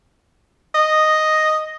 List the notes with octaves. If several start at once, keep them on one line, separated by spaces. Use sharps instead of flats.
D#5